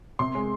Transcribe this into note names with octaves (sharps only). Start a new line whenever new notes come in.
C3 C6
G#3